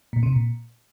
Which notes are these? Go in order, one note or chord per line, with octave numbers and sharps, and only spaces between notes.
A#2
C3
A#2